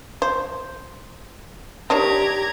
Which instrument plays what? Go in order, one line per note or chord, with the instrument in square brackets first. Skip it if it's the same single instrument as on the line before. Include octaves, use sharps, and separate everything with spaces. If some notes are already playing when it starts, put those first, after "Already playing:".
[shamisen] C5
[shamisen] D#3 D4 C#5 [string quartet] G4 A#5 G#6